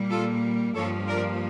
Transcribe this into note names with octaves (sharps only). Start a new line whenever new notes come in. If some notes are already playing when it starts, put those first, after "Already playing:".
Already playing: A#2 G3 A#3
F4 A4
G2 F3 A#3 A4 C#5
A#4 D5